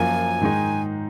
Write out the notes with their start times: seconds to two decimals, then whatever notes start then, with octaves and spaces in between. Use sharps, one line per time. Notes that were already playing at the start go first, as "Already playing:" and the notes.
Already playing: F#2 F3 A#3 F4 G#5
0.41 G#2 D#3 G#3 D#4